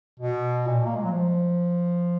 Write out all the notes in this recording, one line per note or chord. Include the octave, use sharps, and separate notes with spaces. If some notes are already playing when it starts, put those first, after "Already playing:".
B2
A#2
A#3
G#3
F#3
F3